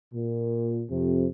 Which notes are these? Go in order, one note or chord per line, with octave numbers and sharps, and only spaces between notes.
A#2
F2 C3